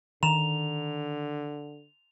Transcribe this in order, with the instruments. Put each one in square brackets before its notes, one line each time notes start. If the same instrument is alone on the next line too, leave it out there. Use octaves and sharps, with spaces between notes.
[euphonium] D3 [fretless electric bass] D#3 [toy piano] A#5 [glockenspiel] F7